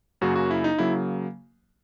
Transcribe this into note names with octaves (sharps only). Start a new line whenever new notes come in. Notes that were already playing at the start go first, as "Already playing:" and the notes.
F#2 C#3 F#3 A#3 F#4
F#4
E4
D#4
C#3 F#3 A#3 E4